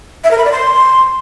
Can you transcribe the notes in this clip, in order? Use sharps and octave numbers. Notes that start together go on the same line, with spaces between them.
E5
A#4
B5
D5
C6